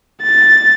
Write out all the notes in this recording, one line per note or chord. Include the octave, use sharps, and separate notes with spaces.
A6